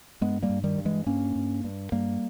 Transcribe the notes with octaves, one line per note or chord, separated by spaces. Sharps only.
G2 G#3 B3
G3 A#3
G2
D#3 G3
G2
E3 G#3
G2 A#3 C#4
G2
G2
G2 G3 A#3